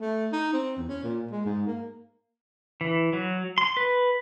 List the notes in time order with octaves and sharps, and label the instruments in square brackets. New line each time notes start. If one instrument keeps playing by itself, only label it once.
[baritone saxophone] A3
D#4
C4
E2
C#4
A#2
G#3
G#2
A#3
[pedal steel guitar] E3
F#3
C6
B4